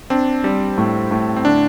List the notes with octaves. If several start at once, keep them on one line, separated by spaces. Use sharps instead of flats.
C4 D4
G3
A2
A2
C4
D3 D4